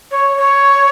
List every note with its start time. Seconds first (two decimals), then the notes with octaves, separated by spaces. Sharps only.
0.10 C#5
0.37 C#5